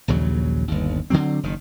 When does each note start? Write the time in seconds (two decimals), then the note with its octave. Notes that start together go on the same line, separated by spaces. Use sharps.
0.08 A#1 D#2 C#3 F#3
0.68 G1 D#2
1.10 D3 D#3 F#3 C4
1.43 F#1 D#3